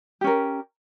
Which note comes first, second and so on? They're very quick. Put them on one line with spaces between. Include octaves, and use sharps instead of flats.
G4 C#4 A#4